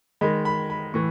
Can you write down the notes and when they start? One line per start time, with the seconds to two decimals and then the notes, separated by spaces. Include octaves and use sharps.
0.21 D#3 G#3 B5
0.45 B5
0.70 B5
0.94 A2 E3 C#6